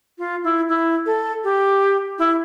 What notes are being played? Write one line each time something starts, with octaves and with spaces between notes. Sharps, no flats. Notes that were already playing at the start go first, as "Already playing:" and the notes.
F4
E4
E4
A4
G4
E4